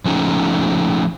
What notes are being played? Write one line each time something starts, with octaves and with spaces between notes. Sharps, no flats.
F3 A3 C#4 D#4